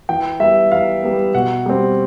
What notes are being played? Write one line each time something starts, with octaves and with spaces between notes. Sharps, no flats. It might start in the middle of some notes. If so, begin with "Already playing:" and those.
E3 G5
G3 B3 E5
E3 F5
G3 B3
B2 F#5
G3 C4